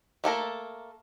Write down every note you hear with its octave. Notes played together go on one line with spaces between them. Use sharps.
A3 A#3 A4 A#4